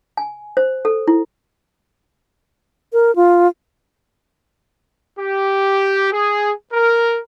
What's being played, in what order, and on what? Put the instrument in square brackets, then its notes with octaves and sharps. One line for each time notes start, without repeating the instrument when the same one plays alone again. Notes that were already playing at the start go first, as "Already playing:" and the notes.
[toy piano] G#5
C5
A4
E4
[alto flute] A#4
F4
[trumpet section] G4
G#4
A#4